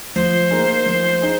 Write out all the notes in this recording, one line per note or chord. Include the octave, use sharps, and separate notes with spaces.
F3 C5
A#3 D#4 G#4
F3
D#4 G#4